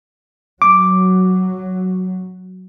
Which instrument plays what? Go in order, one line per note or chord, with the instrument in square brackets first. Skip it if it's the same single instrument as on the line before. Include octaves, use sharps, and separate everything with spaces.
[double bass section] F#3 [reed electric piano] D6